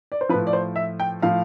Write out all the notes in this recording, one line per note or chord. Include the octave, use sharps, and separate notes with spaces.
D5
C5
A2 F3 B4
D5
C5
E5
G5
A2 F3 F5